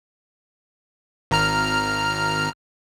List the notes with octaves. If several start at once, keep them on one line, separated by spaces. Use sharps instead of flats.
G#1 A#5 F6